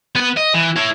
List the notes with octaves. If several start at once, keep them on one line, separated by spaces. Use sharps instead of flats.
B3 B4
D#5
E3
E4 C#5